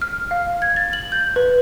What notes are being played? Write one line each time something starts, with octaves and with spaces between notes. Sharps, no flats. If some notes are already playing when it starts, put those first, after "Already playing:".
F6
F5
G#6
A6
F#7
G6
B4